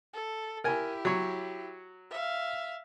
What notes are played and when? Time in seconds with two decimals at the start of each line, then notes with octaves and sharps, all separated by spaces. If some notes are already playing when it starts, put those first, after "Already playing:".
0.13 A4
0.64 E4 G4 A#4 G#5
1.05 F#3 C#5
2.10 E5 F5